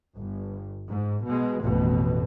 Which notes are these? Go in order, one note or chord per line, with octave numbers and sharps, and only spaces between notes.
G1
G#2
B2 G#3
A1 F2 B2